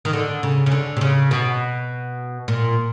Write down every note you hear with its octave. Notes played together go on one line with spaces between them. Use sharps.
D#3
D3
C#3
C#3
D3
C3
C#3
B2
A#2